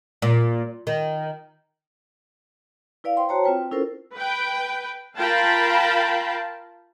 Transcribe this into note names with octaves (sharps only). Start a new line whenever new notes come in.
A#2
D#3
E4 B4 D5 F5
C5 G5 C6
F#4 C5 C#5 A5 A#5
C4 F4 B4 G5
C#4 E4 F4 A4 A#4 C5
B4 G5
F4 A#4 F5 G5 A5 B5